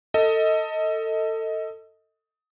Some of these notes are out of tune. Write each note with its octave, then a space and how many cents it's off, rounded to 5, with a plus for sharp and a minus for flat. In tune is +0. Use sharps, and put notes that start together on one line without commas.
A4 +25 D#5 +20